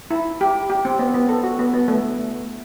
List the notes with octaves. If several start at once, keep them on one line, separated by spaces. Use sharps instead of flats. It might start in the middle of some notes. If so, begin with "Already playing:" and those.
E4
G4
G4
C4
B3
B3
A4
F#4
B3
B3
A3